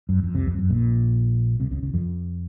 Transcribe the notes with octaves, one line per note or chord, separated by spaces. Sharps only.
F#2
F2
C2 C3
F2
F#2
A#1 A#2
C2 C3
C#2 C#3
C#2 C#3
F2 F3